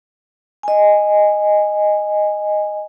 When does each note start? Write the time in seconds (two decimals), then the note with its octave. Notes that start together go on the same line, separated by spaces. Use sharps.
0.63 D#5 G#5